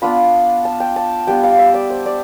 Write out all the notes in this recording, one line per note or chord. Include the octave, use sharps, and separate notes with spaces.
B3 D4 F4 B5
A5
G5
A5
G3 B3 D4 G5
F5
E5
D5
C5
D5